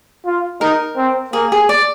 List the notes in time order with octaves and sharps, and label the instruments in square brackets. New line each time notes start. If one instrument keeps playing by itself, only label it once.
[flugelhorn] F4
[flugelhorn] D#4 [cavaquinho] A#4
[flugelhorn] C4
[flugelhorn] A#3 [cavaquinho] G#4
[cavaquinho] G#4
D5